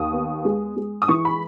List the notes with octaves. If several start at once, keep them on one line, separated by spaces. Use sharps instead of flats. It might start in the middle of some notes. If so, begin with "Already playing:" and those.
Already playing: D#2 D#6
B3
G#3
G#3
D#6
E3 C#6
B5